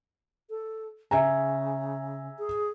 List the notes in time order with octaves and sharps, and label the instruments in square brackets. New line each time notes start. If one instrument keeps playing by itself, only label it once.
[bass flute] A4
[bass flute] C#3 [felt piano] E5 G#5 A#5
[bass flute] G#4